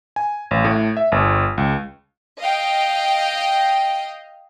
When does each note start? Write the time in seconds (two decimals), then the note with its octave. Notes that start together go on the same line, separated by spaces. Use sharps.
0.16 G#5
0.51 A1
0.64 A2
0.97 E5
1.12 G1
1.58 C#2
2.40 D#5 F5 G5